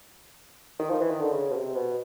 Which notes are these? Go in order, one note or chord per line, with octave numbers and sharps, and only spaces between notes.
D#3
F3
E3
D#3
D3
C#3
B2
C3
B2